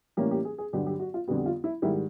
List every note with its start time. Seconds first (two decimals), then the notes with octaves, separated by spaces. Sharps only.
0.17 A2 E3 G3 A#3 C#4 G4
0.31 G4
0.45 G#4
0.58 G#4
0.73 G2 D3 F#3 G4
0.87 G4
1.00 F#4
1.14 F4
1.27 F2 D3 G3 B3 F#4
1.46 F4
1.64 E4
1.82 G#2 D#3 G3 E4